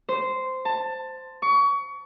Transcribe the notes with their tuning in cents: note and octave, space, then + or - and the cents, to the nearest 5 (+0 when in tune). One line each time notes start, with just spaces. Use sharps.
C5 -10
A5 +15
C#6 +30